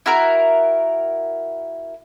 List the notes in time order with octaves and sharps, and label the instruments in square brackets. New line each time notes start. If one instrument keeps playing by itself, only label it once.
[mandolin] E4 F#4 A#4